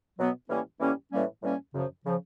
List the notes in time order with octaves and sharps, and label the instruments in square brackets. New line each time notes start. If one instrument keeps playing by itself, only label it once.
[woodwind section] B2 F#3 B3
A2 E3 G3 A#3 C#4
A2 E3 G3 A#3 C#4
A2 E3 G3 A#3 C#4
A2 E3 G3 A#3 C#4
F#2 C#3 F3
C#3 F3